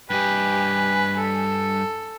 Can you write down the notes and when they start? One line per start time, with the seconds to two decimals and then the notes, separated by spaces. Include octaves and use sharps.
0.10 G2 G4 B4 D#5 G#5
1.17 A4